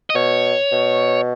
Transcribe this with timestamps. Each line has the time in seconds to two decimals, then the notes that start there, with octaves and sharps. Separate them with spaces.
0.10 D#5
0.15 B2 C#5
0.72 B2